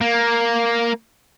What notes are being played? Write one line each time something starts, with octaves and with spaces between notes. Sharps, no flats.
A#3